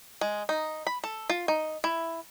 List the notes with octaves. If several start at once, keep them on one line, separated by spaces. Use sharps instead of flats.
G#3
D#4
B5
A4
F4
D#4
E4